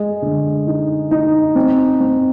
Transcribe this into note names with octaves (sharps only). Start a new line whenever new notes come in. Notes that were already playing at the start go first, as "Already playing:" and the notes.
Already playing: G#3
D3
D#4
D#4
C4
C4